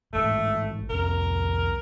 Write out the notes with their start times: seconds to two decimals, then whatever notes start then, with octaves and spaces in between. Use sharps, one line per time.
0.13 A1 G#2 A3
0.89 C2 F2 C4 A#4